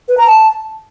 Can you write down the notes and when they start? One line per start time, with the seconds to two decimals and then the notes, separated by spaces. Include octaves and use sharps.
0.08 B4
0.18 A#5
0.27 A5